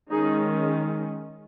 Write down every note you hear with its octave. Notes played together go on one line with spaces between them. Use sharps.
D#3 G#3 C#4 D#4 G#4